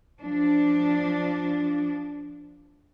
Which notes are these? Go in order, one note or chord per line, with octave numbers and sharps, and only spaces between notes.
F3 D4